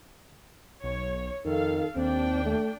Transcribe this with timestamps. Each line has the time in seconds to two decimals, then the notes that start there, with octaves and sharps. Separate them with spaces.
0.84 B1 C#5
1.45 F2 D#3 A4 F5
1.96 D#2 C4 D4 G5
2.46 A3